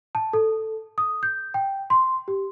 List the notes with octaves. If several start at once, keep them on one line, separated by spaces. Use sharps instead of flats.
A5
A4
D#6
G6
G5
C6
G4